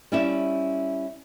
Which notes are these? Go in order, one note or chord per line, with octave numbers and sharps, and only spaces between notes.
G3 C#4 E4 D5 E5